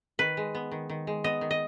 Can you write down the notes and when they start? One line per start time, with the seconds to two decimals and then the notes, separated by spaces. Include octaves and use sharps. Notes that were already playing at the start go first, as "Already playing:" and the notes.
0.19 D#3 B4
0.37 G#3
0.55 B3
0.72 D#3
0.89 D#3
1.07 G#3
1.24 B3 D#5
1.41 D#3
1.51 D#5